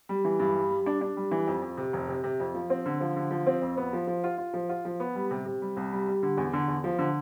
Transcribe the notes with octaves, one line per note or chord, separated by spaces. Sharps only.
G3
E3
G2
G3
G3
D4
D4
G3
E3
F2
F2
C3
F1
C3
C3
F2
F3
C4
D3
F3
D3
F3
C4
F2
B3
F3
F3
F4
F4
F3
F4
F3
B3
G3
C3
C3
G3
C2
G3
G3
D3
E2
D3
E2
F3
D3